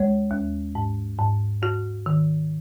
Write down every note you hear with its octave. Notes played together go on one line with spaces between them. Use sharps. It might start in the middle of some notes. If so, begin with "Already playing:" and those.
Already playing: D#2 G#3 C#5
D#2
G#2
G#2
G#2 F#4
D#3